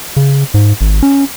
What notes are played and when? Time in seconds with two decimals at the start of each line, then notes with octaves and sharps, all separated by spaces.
0.17 C#3
0.54 G#2
0.81 G#1
1.03 C#4